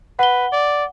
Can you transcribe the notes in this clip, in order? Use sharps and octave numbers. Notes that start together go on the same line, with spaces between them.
B4 F#5 G7
D5